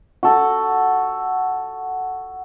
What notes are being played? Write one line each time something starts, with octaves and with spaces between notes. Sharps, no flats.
F#4 A4